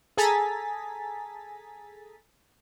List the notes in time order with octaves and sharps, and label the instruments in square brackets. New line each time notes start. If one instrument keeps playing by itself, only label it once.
[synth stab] G#4 A4 G#5 A#5 A6 B6